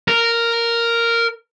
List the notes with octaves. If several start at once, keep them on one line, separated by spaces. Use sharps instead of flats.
A#4